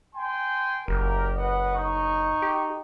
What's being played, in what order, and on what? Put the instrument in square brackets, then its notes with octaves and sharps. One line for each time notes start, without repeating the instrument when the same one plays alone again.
[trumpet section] G5 G#5 C6
[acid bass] F#1 [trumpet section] G4 A#4
[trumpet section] B4 D#5 F#5
D#4 C#6
[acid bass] G4